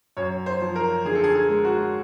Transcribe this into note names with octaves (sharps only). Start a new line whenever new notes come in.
F#2 C#5
C5
F3
A#4
D3 G#4
A4
G#4
G#4
G#3
F#4